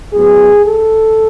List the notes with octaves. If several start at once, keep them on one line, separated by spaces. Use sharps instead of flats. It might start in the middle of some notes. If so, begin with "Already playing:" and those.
A2 F#3 B3 G#4
A4